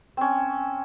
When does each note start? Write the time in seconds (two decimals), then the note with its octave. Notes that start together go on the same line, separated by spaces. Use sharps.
0.17 C4 C#4